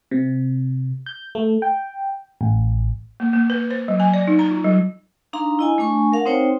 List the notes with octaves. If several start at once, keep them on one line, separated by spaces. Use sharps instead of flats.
C3
G6
A3
G5
A1
A#3
A#3
B4
C5
F#3
G#5
D5
D#4
A#5
F4
F#3
D4 D#4 F5 A#5 C6
E4 D#5 G#5
A3 D4 G#5 C#6
A#4 F5 F#5 A5
C4 D#4 C5 C#5 G5